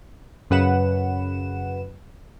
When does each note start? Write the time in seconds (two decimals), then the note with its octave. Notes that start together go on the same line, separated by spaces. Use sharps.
0.50 F#2 C#3 B4 F#5 E7